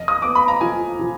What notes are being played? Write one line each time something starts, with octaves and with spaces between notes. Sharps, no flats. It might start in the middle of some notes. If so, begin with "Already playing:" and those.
Already playing: F1 D#5
D#6
B3 D6
B5
A#5
F3 G#5
F3